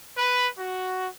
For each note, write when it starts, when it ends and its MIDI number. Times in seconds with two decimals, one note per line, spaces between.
0.17 0.48 71
0.58 1.08 66